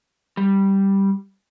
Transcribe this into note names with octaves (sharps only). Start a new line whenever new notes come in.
G3